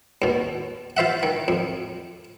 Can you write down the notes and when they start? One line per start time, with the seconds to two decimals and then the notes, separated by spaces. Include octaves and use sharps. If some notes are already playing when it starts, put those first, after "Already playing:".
0.22 D#2 B2
0.97 F4 C5 E5 F#5
1.23 D#3
1.48 F2